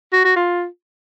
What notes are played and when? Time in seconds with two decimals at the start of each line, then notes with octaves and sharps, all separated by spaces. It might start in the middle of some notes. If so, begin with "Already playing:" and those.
0.13 F#4
0.24 F#4
0.36 F4